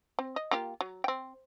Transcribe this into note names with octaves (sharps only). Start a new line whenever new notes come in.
C4
D#5
A#3 F4 G4
F#3
C4 G5